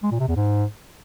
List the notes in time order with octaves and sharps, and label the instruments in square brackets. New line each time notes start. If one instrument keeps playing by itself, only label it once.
[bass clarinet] G#3
A#2
C3
E2
G#2